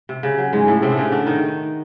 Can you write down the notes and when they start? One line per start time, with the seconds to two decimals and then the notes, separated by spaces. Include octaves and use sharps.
0.09 C3
0.23 C#3
0.38 F#3
0.53 G#2 G#3
0.67 A2 A3
0.82 C3 C4
0.90 D4
0.97 C#3 C#4
1.12 D3 D4
1.26 D#3 D#4